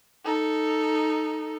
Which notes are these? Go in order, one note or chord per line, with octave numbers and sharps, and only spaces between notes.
D#4 A4